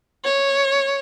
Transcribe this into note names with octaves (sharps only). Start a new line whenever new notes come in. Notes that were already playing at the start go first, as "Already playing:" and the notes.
C#5